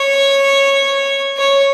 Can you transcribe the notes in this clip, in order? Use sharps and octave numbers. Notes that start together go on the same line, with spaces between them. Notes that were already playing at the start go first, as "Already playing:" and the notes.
Already playing: C#5
C#5